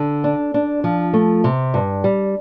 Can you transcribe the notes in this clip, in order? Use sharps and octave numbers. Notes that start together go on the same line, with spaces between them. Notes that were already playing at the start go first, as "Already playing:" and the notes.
Already playing: D3
D4
D4
F3
A3
C3
G2
G3